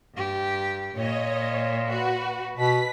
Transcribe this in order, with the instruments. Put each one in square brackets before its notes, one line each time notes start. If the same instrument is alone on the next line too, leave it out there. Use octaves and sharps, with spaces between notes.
[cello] G2 G4
[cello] A#2 [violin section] C#5 D#5
[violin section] F#4 B4
[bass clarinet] B2 [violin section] B4 B6